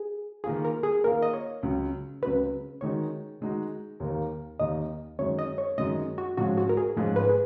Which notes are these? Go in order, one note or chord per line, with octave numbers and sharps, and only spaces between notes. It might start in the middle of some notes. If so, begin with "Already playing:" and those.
Already playing: G#4
D#3 A#3 F4 G#4
A#4
G#4
D#3 A#3 F4 A#4
D#5
C#5
C#2 C#3 F#3
C#2 C#3 F#3 B4
D#3 G#3 D#4 F#4 C#5
D#3 G#3 D#4 F#4
D#2 D#3 A#3
D#2 D#3 A#3 D#5
F#2 D#3 G#3 C#5
D#5
C#5
F#2 D#3 G#3 D#5
F#4
G#2 F3 G#3 C#4 F#4
F#4
A#4
G#4
G#2 F3 G#3 C#4 G#4
B4
G#4